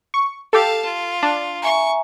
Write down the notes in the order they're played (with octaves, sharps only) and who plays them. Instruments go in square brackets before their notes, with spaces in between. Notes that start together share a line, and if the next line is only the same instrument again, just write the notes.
[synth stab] C#6
[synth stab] G4 A4 [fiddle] F5 A5
[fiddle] F4
[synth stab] D4
[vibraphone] E5 G#5 A#5 [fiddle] C#6